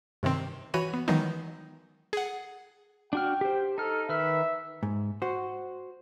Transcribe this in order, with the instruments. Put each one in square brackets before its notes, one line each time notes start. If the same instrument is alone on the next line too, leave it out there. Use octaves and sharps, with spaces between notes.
[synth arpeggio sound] G2 C3 D#3 C4
E3 F#4 C#5 B5 D#7
B3
D#3 E3 F#3 G#3 B3 D#4
G#4 F#5
[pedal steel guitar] D4 F#4 F6 [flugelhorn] G5
[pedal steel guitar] G4 C5
[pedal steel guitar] D#4 F6 [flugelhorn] A4
[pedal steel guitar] D#3 B4 F6 [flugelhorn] E5
[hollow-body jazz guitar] G#2
F#4 C5